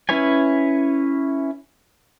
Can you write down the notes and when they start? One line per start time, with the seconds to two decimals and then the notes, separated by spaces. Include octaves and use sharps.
0.09 C#4 E4 B4 C#5 G#5